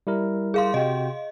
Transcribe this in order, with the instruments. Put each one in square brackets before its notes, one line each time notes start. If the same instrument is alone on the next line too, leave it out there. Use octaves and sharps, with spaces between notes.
[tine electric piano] G3 E4 A#4
[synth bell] G#4 F5 C6
[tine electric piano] C3 F#4 G5 [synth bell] D#5